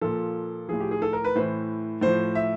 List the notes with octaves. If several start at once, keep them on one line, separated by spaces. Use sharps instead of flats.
A#2 F3 A4
A2 F3 G#4
G4
G#4
A4
A#4
B4
A2 E3 C5
A2 F3 C5
E5